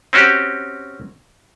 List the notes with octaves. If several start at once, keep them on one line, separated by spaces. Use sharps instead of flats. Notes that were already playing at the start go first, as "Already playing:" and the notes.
C4 C#4 F#4 G4